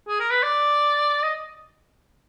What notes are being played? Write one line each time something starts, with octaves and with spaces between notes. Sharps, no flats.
G#4
A#4
B4
D5
D#5